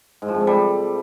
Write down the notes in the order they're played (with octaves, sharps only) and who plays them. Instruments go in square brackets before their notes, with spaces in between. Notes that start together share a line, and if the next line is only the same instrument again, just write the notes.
[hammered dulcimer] G#2
F3
C3
A3
G3